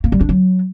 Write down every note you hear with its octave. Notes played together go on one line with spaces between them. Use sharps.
A#3
G3
D4
F#3